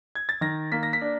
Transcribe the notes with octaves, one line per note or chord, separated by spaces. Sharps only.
G#6
A6
D#3 A#6
A#3 B6
A#6
B6
D4